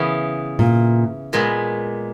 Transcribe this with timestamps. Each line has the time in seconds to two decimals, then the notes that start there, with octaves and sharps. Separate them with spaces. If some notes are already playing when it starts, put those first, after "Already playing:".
Already playing: C#3 E3 B3
0.59 A#2
1.33 A#2 G#3 B3